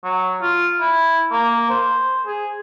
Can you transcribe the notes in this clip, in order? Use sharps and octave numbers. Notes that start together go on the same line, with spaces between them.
F#3
F4
E4
A#3
C5
G#4